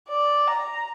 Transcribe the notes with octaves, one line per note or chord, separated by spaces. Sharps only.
D5
A#5